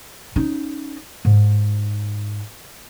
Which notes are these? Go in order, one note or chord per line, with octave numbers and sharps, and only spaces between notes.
C#4 D#4
G#2